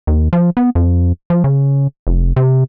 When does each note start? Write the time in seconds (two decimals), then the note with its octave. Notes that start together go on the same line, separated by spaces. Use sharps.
0.07 D#2
0.33 F3
0.57 B3
0.75 F2
1.30 F3
1.44 C#3
2.07 F1
2.36 C3